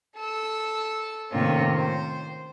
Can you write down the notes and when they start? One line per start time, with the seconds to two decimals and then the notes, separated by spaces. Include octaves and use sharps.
0.17 A4 E6
1.31 A2 C3 D#3 A#3 C#4 F4
1.76 C5